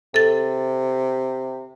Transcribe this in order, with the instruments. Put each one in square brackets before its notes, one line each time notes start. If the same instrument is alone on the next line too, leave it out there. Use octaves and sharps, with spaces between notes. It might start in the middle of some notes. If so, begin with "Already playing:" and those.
[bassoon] C3 [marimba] A4 A6